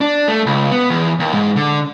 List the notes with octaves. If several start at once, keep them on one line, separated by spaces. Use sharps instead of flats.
D4
A3
C#2
B3
E2
D#2
G#2
D3